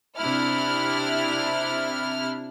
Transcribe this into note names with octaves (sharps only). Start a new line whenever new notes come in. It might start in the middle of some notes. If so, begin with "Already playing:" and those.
C3 D4 E4 F6